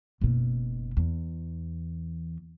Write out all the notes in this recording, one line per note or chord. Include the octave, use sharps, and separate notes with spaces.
F#1 B2
E2